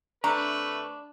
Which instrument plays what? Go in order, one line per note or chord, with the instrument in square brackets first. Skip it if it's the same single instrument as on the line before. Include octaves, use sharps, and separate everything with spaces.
[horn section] C3 A3 B4 [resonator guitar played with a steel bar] D4 [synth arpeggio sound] A#5 [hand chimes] C#6